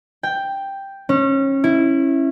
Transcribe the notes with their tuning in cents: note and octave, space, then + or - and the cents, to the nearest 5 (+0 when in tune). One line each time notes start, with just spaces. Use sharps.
G5 +5
C#4 -25
E4 -5